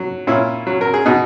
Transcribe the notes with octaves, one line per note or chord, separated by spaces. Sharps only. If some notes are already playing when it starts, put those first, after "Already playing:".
Already playing: F#3
A#2 C#4 E4
F#3
A#4
G#4
B2 D#4 F#4